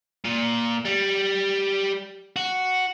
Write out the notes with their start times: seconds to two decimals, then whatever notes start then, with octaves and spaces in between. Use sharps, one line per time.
0.24 A#2
0.85 G3
2.36 F#4